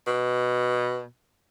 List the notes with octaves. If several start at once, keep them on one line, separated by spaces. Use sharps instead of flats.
B2